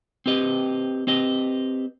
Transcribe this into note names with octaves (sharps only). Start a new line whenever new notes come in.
C4 G4 B4 D#5
C4 G4 B4 D#5